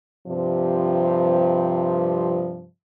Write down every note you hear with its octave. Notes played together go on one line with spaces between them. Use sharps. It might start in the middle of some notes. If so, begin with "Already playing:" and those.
G2 C3 F3